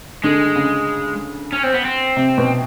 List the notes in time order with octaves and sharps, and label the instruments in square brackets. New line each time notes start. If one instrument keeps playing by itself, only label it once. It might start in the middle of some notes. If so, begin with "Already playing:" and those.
[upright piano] D3 [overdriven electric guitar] G#3
[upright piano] C#3
[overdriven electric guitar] C#4
C4
B3
C4
[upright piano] C3
B2